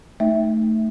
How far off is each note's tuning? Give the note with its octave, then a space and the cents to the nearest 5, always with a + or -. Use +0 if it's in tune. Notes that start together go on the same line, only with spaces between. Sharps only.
A3 +5 D#4 +0 E5 +0